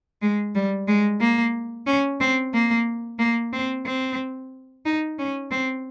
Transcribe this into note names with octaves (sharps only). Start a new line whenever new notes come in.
G#3
G3
G#3
A#3
C#4
C4
A#3
A#3
C4
C4
D#4
C#4
C4